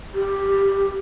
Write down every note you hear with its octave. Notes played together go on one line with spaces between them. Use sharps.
G4